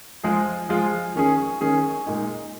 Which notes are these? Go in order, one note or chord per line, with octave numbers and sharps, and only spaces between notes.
F3 G#3 F4 G#4
F3 G#3 F4 G#4
D#3 C#4 G#4
D#3 C#4 G#4
A#2 G#3 D#4